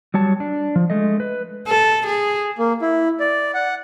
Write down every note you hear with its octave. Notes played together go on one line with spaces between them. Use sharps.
F#3 G3 C#5 A5
D4
F3
G#3 A3 D#5
B4
A4
G#4
A#3
E4
D5
F#5